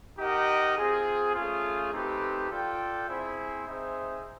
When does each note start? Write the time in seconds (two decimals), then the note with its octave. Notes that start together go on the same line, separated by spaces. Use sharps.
0.18 D#4 G4 A#4 D#5 F#5
0.76 C4 F4 G#4
1.34 A3 C#4 F4 G#4
1.93 A3 C4 D#4 G4 B4
2.50 F4 A4 D5 G5
3.08 C4 E4 G#4 C5 E5
3.66 C4 D#4 G#4 C5 E5